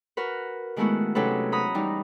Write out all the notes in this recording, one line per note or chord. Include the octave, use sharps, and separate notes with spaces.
F#4 A#4 B4
D#3 G#3 A3 B3 E4 F#4
C3 F#3 C#4 D#4 A4 B4
F#4 A#5 B5 D#6
E3 G3 D#4